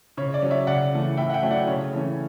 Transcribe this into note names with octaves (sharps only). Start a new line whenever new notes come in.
C#3 C#5
D5
F#3 C#4
C#5 E5
C#3 D5 F#5
E3 A3
A2 E5 G5
F#5
E5 G5
F#3 A3 C#4
D5 F#5
C#3 C#5
E3 A3 C#4